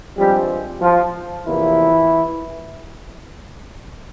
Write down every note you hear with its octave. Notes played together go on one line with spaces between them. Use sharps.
G2 F3 G3 G#3 C4 G4
F3 F4
E2 C3 E3 F3 A#3 E4